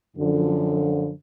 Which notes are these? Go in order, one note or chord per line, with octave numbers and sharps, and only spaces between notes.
F#2 D3 F3